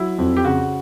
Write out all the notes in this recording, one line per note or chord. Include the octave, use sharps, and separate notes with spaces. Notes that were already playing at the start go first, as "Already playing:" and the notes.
Already playing: F#3 E4
F2
G4
C#3 F#4